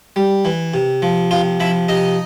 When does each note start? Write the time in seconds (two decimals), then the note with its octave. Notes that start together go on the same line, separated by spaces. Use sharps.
0.16 G3
0.45 E3
0.74 C3
1.02 F3
1.31 C3 F4 F5
1.60 F3 E4 E5
1.88 C3 D#4 D#5